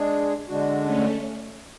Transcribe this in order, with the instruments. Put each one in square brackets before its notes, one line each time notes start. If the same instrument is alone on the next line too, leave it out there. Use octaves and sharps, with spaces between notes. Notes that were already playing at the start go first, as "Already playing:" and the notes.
Already playing: [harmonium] G#3 D4 G#4
D3 G#3 D4 F#4
[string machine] A3 C#4